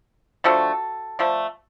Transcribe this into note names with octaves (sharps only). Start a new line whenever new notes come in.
D3 F3 A3 D4 F#4 A4
D3 F3 A3 D4